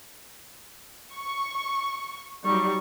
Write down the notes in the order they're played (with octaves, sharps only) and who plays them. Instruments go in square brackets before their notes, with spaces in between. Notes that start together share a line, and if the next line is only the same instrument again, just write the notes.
[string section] C#6
[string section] F#3 G3 [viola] D#4 C#6